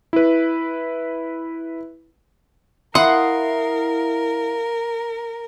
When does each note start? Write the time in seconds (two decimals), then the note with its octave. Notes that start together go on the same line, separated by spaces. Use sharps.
0.13 E4 B4
2.95 E4 A#4 F5 F#5 C6 D#6